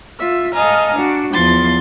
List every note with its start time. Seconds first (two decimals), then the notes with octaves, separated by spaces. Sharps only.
0.17 F4 E5
0.52 A4 D#5 F5 G#5 A#5
0.94 D4 F#4
1.31 E2 F3 C6 A6